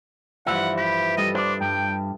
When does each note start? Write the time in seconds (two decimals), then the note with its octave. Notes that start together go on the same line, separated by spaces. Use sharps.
0.47 G2 E3 F3 E5 F#5
0.77 G4 B4
1.17 G3 A4 D#5 D#6
1.35 D4 C5 D5
1.61 G2 G5